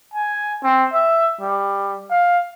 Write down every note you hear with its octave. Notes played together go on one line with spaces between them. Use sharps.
G#5
C4
E5
G3
F5